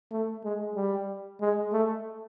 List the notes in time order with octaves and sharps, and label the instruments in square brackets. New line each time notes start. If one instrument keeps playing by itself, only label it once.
[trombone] A3
G#3
G3
G#3
A3